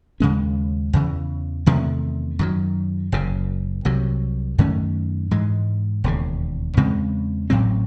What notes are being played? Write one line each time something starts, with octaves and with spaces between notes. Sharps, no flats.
D#2 C#3 G#3 C#4
E2 C#3 E3
E2 C3 D#3 A3
F#2 D#3 F#3
F#1 F#2 C#3
C2 C3 F#3
F#2 D#3 A3 C#4
G#2 E3 G#3
E1 D#2 C#3
E2 C#3 G#3 C4
A1 A2 F#3 C4